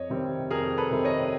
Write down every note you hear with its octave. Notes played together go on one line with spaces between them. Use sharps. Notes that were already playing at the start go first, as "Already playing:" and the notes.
Already playing: F2 C#5 D#5
C3 D#3 G3 C4
F2 G#4 A#4
A4 B4
C3 D#3 G3 C4
C#5 D#5